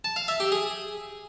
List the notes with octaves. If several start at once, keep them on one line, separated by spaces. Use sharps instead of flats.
A5
F5
E5
G4
G#4